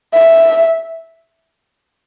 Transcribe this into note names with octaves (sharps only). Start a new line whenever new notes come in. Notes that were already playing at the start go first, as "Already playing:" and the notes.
E5